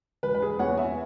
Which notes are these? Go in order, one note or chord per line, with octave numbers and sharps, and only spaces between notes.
E1 B4
B4
G#4
E2 B2 B3 C#5 F#5
E5 G#5